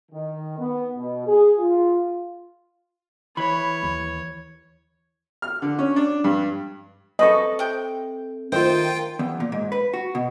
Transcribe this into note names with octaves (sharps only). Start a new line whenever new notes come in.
D#3
B3
B2
G#4
F4
E3 C#5 B5
D#2
F6
D3
C#4
D4
G2
C4 A4 B4 D#5 C#6
C3 G5
D#3 A3 D#4 F4 C5 G5
E2
A#2
G#2
B4
F#4
B2